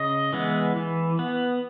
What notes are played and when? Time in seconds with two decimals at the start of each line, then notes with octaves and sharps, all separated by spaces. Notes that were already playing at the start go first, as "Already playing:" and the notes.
Already playing: C#3 D#5
0.33 E3 G#3 B3
0.76 E3
1.19 B3